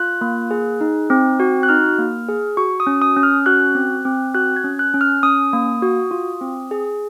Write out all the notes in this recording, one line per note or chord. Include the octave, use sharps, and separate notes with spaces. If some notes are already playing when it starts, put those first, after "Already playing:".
Already playing: F4 F#6
A#3
G#4
D#4
C4
F#4
F#6
D#4 F6
A#3
G#4
F#4 C#6
D#6
C#4
D#6
C#4
F6
F#4 F#6
C4
C4
F#4 F#6
G#6
C#4
F#6
C#4
F6
C#4 D#6
A#3
F#4
F4
C4
G#4